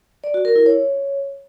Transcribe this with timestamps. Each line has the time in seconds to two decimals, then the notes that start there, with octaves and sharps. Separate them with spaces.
0.24 D5
0.34 F#4
0.45 A#4
0.56 E4
0.66 C#5